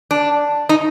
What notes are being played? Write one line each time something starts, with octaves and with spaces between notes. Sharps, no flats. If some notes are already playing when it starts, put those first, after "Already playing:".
D4
D#4